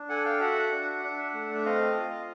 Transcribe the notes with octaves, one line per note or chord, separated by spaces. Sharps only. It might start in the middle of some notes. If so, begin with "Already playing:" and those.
Already playing: D4
A4 F#5 G#5
F5 G5
F#4 E5 F#5
D4
D4
A3
E5
C4 D#5 F5
F4